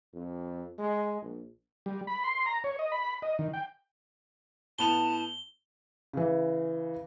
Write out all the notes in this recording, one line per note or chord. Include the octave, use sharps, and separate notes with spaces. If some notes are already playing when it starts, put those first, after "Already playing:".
F2
G#3
A#1
G3
B5
C6
A#5
C#5
D#5
B5
D#5
D#3
G5
A2 B3 A5 F7 G7
C#3 E3